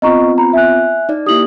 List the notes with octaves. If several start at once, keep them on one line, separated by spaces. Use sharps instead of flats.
B3 C4 F4 D#5 A#5 C#6
A#5 B5
E5 G#5 F#6
D#4 D5
A#3 E4 G4 D#6 F#7